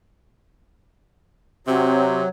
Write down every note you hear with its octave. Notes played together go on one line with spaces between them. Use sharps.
C3 F#3 C4